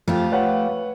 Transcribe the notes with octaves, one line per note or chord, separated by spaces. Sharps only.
F2 A3 F4 G4
B4 C#5 F#5